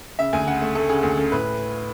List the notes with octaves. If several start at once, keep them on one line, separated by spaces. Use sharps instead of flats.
C#3 E5
D2 G#5
C#3 F#5
A3
A3 A4
C#3 G#4
D2
C#3 A4
A2 B4